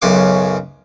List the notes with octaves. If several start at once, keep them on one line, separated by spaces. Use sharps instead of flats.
B1 F#2 C#3 C6 D6